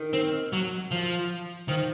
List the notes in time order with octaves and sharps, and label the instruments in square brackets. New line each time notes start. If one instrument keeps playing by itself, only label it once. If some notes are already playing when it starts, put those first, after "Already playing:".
Already playing: [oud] D#3
[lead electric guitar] C4
F#3
F3
[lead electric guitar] D#3 [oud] F3